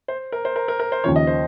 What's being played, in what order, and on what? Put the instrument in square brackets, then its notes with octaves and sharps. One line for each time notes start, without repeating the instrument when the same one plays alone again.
[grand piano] C5
A#4
C5
A#4
A#4
A#4
C5
[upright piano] D#2 C#3 F3 [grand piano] C#5
[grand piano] D#5
C5